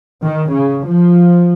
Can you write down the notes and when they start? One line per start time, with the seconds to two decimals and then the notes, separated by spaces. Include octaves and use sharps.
0.23 D#3
0.53 C#3
0.88 F3